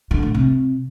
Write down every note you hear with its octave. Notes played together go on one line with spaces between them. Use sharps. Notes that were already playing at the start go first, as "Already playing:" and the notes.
D3
A2
C3